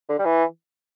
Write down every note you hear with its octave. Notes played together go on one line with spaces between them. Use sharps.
D3
G3
E3